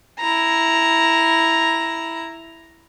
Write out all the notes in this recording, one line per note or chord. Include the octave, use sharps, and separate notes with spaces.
E4 A#5